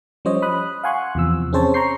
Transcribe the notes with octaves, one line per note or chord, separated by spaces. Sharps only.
F3 G3 C#4 C5 C#5 D#5
B5 D#6 F#6
F5 F#5 G#5 C6 C#6 F#6
E2 C3 F3 E6
C4 C#4 G#4 C5 C#5 A5
A#5 C6 C#6 G6 C7